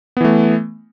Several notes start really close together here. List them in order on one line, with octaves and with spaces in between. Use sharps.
B3 E3 A3